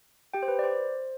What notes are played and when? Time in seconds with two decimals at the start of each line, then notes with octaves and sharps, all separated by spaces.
0.34 G4 G5
0.43 C5
0.48 B4
0.59 D5
0.64 C5